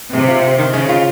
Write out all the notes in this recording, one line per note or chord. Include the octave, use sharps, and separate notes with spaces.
C3 G#3
F4
C4
D#3
C#3 G#3
F4